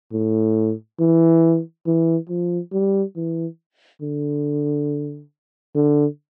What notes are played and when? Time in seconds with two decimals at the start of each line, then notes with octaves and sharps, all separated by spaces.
0.13 A2
1.00 E3
1.87 E3
2.29 F3
2.73 G3
3.16 E3
4.02 D3
5.76 D3